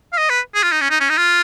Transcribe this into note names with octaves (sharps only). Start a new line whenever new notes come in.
F5
D#5
B4
G#4
F4
D#4
C#4
D#4
C#4
D#4
F4